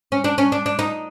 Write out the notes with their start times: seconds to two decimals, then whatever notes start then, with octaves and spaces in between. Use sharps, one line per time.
0.12 C#4
0.24 D4
0.38 C#4
0.52 D4
0.66 D4
0.79 D#4